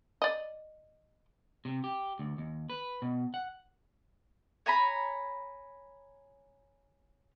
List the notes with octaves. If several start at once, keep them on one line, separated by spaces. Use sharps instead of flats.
D5 D#5
C3
G4
D2
D#2
B4
B2
F#5
C#5 G#5 A#5 B5